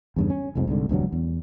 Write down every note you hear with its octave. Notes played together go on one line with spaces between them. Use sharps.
E2 G2 C#3
C#4
F1 C2 F2 G#2
C2 G#2 D3
E1 D2 G2 F#3
E2